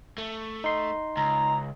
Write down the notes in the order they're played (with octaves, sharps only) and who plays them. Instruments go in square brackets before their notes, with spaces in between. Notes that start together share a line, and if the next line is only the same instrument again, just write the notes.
[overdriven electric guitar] A3
[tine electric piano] D#4 C6
[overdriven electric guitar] C#2 [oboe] A#5